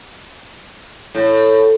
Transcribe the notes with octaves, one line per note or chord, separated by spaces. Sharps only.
A2